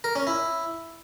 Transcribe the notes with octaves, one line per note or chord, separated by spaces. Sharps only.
A#4
C#4
E4